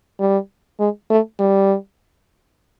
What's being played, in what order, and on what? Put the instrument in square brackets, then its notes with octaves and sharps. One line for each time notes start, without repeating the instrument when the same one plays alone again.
[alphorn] G3
G#3
A3
G3